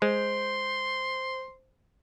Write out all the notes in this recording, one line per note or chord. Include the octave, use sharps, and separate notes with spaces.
G#3 C5 C6